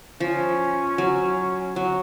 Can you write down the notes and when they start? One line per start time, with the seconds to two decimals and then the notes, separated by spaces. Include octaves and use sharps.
0.20 F3 C#4
0.98 F#3
1.76 F#3